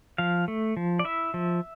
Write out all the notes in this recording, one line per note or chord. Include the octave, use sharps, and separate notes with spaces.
F3 F5
A3
F3
D5
E4 E5
F3